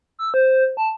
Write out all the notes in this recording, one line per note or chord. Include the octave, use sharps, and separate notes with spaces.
E6
C5
A5